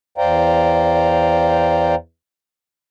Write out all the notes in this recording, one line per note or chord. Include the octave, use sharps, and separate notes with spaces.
E2 C5 D5 F5 G5 A#5